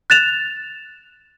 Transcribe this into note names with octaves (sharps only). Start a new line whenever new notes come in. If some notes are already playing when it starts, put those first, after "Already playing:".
F#6 A6 E7 F7